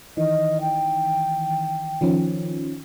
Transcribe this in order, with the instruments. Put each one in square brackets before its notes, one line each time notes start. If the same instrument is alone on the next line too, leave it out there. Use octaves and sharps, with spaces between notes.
[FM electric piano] D#3 E3 [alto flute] D#5
[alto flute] G5
[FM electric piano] D#3 F3 C#4